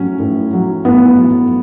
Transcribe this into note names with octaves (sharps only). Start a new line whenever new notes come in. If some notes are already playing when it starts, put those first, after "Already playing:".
Already playing: A2 F#3 C#4
A2
F#3
A2 B3
F#3